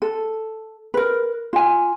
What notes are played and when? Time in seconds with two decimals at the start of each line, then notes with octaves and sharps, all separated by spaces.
0.02 A4
0.94 A#4 B4
1.53 F4 G#5